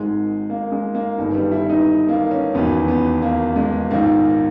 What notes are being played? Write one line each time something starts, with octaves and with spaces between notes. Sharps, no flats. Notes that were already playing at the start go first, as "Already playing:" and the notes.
Already playing: G#1 G#2 D#3 G#3
A#3
G#3
A#3
G1 G2 D#3
G3
E4
D#4
A#3
C#4
E1 D#2 C#3 E3 B3
B3
A#3
G#3
A#1 G#2 D#3 A#3